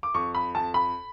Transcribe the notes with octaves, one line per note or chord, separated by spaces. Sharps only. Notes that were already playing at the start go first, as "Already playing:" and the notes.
D6
F2 C#6
B5
F2 A5
B5